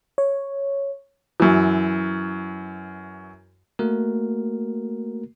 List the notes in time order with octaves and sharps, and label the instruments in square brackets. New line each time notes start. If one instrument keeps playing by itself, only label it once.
[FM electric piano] C#5
[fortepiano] F#2 E3
[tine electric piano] A3 A#3 F#4 A#4